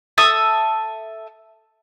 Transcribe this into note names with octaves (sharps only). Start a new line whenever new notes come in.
A4 E5 D#6